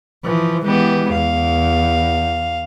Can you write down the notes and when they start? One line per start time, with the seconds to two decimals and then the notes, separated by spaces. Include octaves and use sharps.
0.24 E3 F3
0.65 E3 G#3 B3 G4
1.12 E2 F5